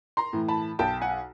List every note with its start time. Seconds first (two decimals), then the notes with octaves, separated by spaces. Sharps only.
0.17 A#5 C6
0.33 A2 E3
0.48 A5 B5
0.79 B1 G5 A5
1.01 F#5 G#5